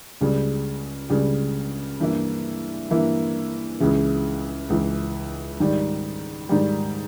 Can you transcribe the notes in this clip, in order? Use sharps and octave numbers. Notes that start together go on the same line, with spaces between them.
C#2 C#3 G3
C#2 C#3 G3
G2 E3 A#3 E4
G2 E3 A#3 E4
C#2 C#3 E3
C#2 C#3 E3
G#2 D#3 G3
G#2 D#3 G3